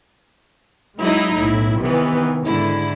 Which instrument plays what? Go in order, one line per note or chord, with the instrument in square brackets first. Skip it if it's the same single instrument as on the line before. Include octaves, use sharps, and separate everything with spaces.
[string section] F#3 G#3 D#4 E4 D#5
B1 A2 E4
C3 D#3 E3 B3
G#2 D3 E4